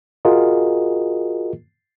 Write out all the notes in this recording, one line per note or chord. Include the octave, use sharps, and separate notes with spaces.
F4 F#4 G#4 A#4 D#5